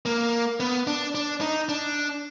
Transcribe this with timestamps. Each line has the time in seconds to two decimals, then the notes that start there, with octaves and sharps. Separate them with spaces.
0.06 A#3
0.60 B3
0.87 D4
1.15 D4
1.41 D#4
1.69 D4